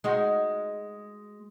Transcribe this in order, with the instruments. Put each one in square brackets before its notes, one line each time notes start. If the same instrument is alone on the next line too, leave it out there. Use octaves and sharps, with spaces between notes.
[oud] G#3 D#4 F#4